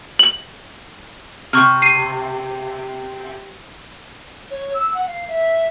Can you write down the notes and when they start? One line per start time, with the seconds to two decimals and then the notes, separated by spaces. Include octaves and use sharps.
0.19 F#7
1.53 C3 C#6 F6
1.82 C7 D#7
4.51 C#5
4.74 E6
4.94 F#5
5.07 F5
5.28 E5